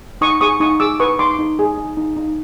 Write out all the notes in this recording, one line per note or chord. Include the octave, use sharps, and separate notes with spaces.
D#4 C#6 D#6
G#4 C#6 D#6
D#4 C#6 D#6
G#4 D6 E6
B4 C#6 D#6
D#4 C6 D6
D#4
G#4
D#4
D#4
D#4